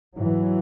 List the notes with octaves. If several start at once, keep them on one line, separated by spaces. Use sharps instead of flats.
G#2 E3 F#3